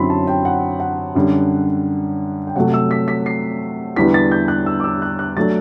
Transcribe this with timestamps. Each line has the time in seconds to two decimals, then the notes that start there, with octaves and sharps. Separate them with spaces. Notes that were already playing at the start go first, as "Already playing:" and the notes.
Already playing: F#2 D3 F#3 C4 E4 B5 C6
0.10 A5
0.27 G5
0.45 F#5
0.80 F#5
1.15 F#2 D3 G3
2.47 G5
2.55 C3 F#3 A3 F#5
2.74 E6
2.91 B6
3.08 B6
3.26 C7
3.96 E2 D3 G3 B3 E4 B6
4.14 A6
4.31 G6
4.48 F#6
4.66 E6
4.80 D6
4.84 E6
5.02 F#6
5.19 F#6
5.37 F#3 A3 D4 A6